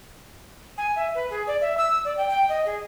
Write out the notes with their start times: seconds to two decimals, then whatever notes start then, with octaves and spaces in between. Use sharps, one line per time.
0.78 G#5
0.96 E5
1.15 B4
1.30 G#4
1.47 D5
1.61 E5
1.77 E6
2.04 D5
2.17 G5
2.29 G5
2.49 D#5
2.66 G#4